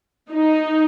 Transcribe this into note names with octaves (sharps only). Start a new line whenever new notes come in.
D#4